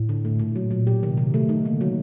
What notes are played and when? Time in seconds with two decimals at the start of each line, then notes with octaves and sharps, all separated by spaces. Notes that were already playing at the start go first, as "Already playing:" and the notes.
Already playing: A2
0.09 D3
0.25 A3
0.40 A#2
0.56 F#3
0.71 A#2 F#3
0.87 G4
1.02 C3 D#3
1.17 D#3
1.34 A3
1.49 D#4
1.65 D3 A#3
1.81 F#3